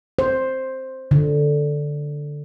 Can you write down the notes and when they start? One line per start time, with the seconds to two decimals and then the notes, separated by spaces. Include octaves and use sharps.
0.19 C5
1.11 D3